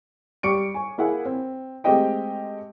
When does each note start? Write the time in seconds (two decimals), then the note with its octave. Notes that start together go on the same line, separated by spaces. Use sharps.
0.43 G3 C#6 D6 C#7 D7
0.74 G#5 C#6
0.98 A#3 E4 G#4 F#5 G#5
1.25 C4
1.84 G#3 A3 C4 G4 D#5 G5